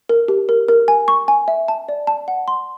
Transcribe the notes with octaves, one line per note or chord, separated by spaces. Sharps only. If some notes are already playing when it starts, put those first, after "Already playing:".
A#4
G4
A#4
A#4
G#5
C#6
G#5
E5
A5
D5
A5
F#5
C6